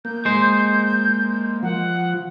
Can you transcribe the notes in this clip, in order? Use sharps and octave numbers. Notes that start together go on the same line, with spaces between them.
A#3 G6
G#3 C5
F3 F#5